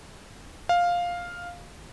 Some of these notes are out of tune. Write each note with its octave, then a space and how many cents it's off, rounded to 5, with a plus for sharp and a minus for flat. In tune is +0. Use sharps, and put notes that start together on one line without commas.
F5 +5